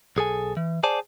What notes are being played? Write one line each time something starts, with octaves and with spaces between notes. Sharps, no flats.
B1 G#4 A4 G#5
E3
G#4 C5 D5 G#5 A5